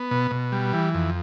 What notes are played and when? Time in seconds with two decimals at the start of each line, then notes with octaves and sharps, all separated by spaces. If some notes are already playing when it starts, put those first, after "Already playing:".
Already playing: B3
0.11 B2
0.31 B2
0.52 G3
0.73 E3
0.94 F2